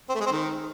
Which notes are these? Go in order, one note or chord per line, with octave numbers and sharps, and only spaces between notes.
C4
A3
G#3
C4
D#3